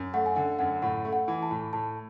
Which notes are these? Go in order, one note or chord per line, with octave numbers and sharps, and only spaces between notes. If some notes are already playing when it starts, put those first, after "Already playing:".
Already playing: F#2
A3 F#5
G#5
D3 F#5
F#2 F#5
A2 F#5
A3
F#5
E3
A5
A2
A2 A5